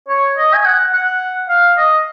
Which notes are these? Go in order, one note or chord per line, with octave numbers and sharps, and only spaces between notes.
C#5
D#5
G#5
F#5
F#5
F5
D#5